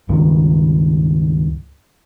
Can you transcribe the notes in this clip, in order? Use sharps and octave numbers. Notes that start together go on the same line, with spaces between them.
C#2 G2 D#3